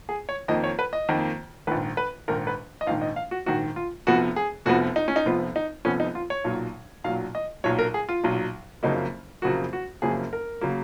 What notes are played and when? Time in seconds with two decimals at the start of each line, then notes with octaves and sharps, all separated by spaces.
0.09 G#4
0.29 C#5
0.48 F2 D#3 A#3 D#5
0.64 C#5
0.79 B4
0.93 D#5
1.09 F2 D#3 A#3
1.67 A#1 G#2 D#3 B4
1.97 B4
2.28 A#1 G#2 D#3 A#4
2.47 B4
2.81 D#5
2.87 A#1 G#2 D#3 F5
3.02 D#5
3.16 F5
3.31 F#4
3.46 A#1 G#2 D#3 F#4
3.76 F4
4.07 F1 F2 F3 B3 F#4
4.36 G#4
4.66 F1 F2 F3 B3 F#4
4.96 D#4
5.08 C#4
5.16 D#4
5.25 F1 F2 F3 B3 F4
5.56 D#4
5.85 F1 F2 F3 B3 C#4
6.00 D#4
6.15 F4
6.30 C#5
6.44 B1 A#2 F#3
7.04 B1 A#2 F#3 F5
7.35 D#5
7.64 B1 A#2 F#3 C#5
7.79 A#4
7.94 G#4
8.09 F4
8.23 B1 A#2 F#3
8.83 F#1 F2 C#3 F#3 A#3 D#4
9.42 F#1 F2 C#3 F#3 A#3 F#4
9.73 F#4
10.02 F#1 F2 C#3 F#3 A#3 G#4
10.33 A#4
10.61 C#3 F#3 A#3